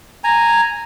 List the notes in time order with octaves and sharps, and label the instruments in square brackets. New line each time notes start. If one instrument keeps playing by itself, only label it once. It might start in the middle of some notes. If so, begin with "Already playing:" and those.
[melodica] G#5 A#5